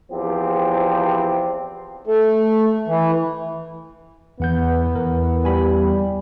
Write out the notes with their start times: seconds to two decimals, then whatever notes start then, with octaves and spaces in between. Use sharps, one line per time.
0.11 E2 F3 C4 G4
2.06 A3
2.88 E3
4.40 E2 B3 F#5 G6
4.95 E2 A#4
5.45 G3 G#5 B5